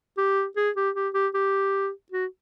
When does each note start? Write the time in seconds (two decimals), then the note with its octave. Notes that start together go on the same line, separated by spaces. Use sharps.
0.17 G4
0.56 G#4
0.76 G4
0.95 G4
1.14 G4
1.34 G4
2.12 F#4